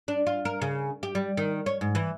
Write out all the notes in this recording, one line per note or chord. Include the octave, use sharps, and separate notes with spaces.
D4
F4
A#4
C#3
G4
G3
D#3
C#5
G#2
E3